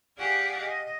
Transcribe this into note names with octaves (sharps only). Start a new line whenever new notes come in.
G4 G#4 D5 F5 F#5 G#5
D#5